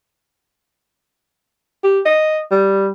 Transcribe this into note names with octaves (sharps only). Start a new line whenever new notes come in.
G4
D#5
G3